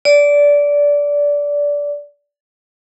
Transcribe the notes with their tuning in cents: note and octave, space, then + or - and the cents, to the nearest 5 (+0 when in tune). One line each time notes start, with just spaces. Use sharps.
D5 -20